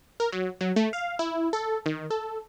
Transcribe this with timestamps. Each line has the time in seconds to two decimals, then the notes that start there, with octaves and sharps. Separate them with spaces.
0.20 A#4
0.33 F#3
0.61 F#3
0.76 A3
0.93 F5
1.19 E4
1.53 A4
1.86 D#3
2.10 A4